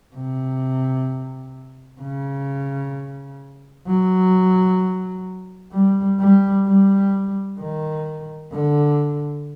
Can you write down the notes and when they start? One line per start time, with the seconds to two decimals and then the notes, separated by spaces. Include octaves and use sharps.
0.16 C3
2.01 C#3
3.88 F#3
5.73 G3
6.20 G3
6.67 G3
7.60 D#3
8.53 D3